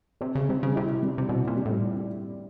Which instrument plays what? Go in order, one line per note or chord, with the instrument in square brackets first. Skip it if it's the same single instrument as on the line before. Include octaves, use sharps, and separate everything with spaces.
[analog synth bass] C3 [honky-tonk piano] C4
[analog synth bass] C#3
[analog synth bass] C3 [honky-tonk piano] G3
[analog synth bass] C#3
[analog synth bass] C3 [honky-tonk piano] E4
[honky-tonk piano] G3
[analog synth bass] C3
[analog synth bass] B2 [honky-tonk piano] C4
[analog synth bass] A#2
[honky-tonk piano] G3
[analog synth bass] A2